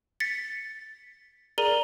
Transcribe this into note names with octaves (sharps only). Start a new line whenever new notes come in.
A6 B6 C#7
G#4 A#4 D5 A#5 D#7 G7